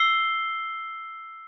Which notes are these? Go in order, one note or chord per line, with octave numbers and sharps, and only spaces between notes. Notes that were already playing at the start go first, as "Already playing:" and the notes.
Already playing: E6 C7 G7